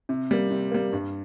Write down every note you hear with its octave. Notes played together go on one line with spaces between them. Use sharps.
C3
G3 A#3
C3
G3 A#3
G2